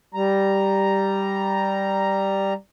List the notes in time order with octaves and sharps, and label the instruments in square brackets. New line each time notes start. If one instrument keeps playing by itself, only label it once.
[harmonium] G3 A#5